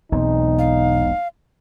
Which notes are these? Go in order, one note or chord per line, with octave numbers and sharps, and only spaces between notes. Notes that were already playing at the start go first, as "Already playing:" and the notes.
E1 B1 B2 C4 D#4
F5